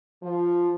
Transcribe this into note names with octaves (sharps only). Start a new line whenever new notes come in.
F3